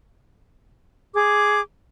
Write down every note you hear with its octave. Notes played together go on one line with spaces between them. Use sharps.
G#4 D6